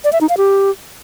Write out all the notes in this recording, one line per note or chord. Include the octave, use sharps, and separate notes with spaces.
D5
E5
D#4
F5
G4